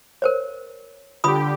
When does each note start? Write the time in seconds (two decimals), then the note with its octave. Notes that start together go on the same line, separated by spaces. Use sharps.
0.22 A#4 C5 C#5
1.24 D3 F4 G4 B5 D#6